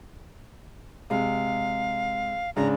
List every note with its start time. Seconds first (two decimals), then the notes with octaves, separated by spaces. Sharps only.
1.10 C3 G#3 F5
2.56 G#2 C#3 D4 A#5